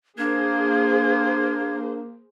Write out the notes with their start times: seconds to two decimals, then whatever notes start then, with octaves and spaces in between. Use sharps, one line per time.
0.18 A#3 D4 G#4 C5 G#6